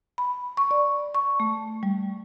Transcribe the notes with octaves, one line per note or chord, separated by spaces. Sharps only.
B5
C#6
D5
C#6
A3
G3